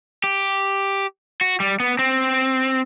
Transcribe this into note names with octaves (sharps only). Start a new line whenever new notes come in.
G4
F#4
G3
B3
C4